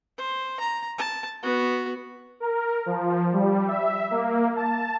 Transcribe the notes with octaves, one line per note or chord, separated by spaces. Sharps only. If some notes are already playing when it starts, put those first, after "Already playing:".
C5
A#5
A5
B3 F#4
A#4
F3
G3
E5
A#3
A5